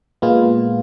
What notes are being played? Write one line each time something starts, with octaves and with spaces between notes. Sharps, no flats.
A#2 G#3 B3 F4